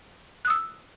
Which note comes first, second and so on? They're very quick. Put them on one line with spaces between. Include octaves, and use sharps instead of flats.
F#6 D#6 E6